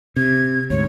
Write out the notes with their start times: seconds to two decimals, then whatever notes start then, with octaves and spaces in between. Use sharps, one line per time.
0.16 C3 G#6
0.70 D2 G#2 C#5